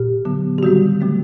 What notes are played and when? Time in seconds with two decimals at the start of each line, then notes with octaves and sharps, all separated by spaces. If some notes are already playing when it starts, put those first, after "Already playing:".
Already playing: A#2 G4
0.25 D3 F#3 B3
0.58 G4
0.63 D#3 G3 C4 F#4
1.01 D3 F#3 A3 C4